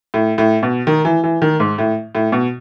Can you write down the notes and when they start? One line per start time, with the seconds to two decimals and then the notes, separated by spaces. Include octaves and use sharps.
0.14 A2
0.38 A2
0.63 B2
0.87 D#3
1.05 E3
1.24 E3
1.42 D#3
1.60 G#2
1.78 A2
2.15 A2
2.32 B2